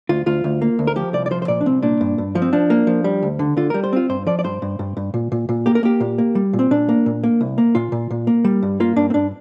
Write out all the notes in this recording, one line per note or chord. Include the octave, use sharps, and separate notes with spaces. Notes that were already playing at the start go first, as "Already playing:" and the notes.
D2 F4
D2 F4
D2
A#3
D2
A#4
F3 G4
C2 D5
D5
F3 C5
C5
A#2 D5
D4
C2 C4
A#2 D4
G2
G2
F3
C4
F3 D4
A#3
F3
G3
D2
D3
D3 F4
G3 A#4
C5
C4 F4
G2 C5
F3 D5
D5
G2 C5
G2
G2
G2
A#2
A#2
A#2
A#3 G4
A#4
A#3 G4
A#2
A#3
G3
A#2
C4
A#2 D4
A#3
A#2
A#3
C2
A#3
A#2 F4
A#2
A#2
A#3
G3
G2
A#3 F4
G2 D4
C4
G2 D4